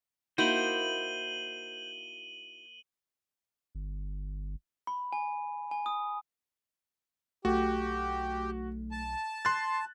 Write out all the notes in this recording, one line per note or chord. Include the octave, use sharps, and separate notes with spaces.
A#3 D#4 E4 F#4 C5 D#7 F#7 G7
G1
B5
G#5
G#5
D#6
B1 A3 F#4 G4
A5
C6 F#6 A6